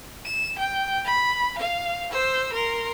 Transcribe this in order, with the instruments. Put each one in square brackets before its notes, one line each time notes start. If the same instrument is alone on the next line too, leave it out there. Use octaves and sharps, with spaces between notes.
[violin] E7
G5
B5
F5
C5 E6
A#4 C6